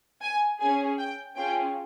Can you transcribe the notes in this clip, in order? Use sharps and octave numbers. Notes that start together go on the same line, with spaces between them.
G#5
C#4 G#4 G#5
G5
C#4 F4 G#4 G5